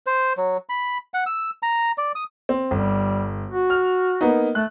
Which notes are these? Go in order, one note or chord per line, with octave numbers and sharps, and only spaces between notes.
C5
F#3
B5
F#5
E6
A#5
D5
D#6
C4
G1 G3
F#4
F6
A#3 B3 D#4
A3 F#6